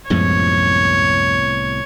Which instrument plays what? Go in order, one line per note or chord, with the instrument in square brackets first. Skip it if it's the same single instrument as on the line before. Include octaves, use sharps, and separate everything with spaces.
[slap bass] C2 A2 B3 [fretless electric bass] F#2 F3 G#3 [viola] C#5